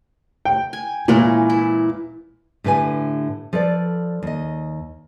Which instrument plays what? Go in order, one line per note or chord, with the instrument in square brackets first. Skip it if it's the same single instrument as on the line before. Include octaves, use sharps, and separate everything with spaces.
[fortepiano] G5
[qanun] G#5
[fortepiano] A#2 [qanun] E3 G#3 C#4
[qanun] E4
[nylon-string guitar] A2 D3 G4 B4 D#5 G#5
F3 A4 B4 D5
D#2 D#5